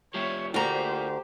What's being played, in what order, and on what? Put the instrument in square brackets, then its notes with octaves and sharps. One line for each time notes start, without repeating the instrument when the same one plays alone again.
[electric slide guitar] G3 F4 G4 [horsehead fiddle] C#5 E5
[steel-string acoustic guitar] D2 A#5 [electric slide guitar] F4 A#4 [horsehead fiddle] G4 C5